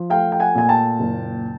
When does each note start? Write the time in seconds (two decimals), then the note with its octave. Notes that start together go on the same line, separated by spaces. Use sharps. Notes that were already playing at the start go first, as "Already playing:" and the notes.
Already playing: F3
0.10 A3 F5 G5
0.32 G5
0.40 F#5 G#5
0.55 A#2 G#5
0.69 G5 A5
0.99 F#1